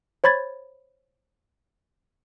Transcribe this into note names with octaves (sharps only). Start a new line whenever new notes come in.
C5 C#5 B5 G#6 A6